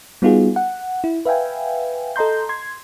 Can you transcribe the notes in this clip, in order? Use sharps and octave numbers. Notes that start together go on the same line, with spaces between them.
G3 B3 D#4 F4 F#4 G#4
F#5
E4
B4 E5 F5 G5 G#5
A4 D#5 A#5 C6 G6
C6 G#6